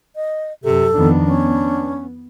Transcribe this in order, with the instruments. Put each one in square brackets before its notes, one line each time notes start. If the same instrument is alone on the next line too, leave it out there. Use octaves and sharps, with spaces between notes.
[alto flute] D#5
[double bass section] F#2 [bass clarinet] C3 [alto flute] A4
[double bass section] F2 D#3 B3 [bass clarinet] D4
[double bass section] B3 [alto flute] C#4